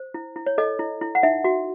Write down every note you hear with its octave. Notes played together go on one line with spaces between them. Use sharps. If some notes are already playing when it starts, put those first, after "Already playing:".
Already playing: C5
E4
E4
C#5
A4 D#5
E4
E4
F#5
D#4 E5
F#4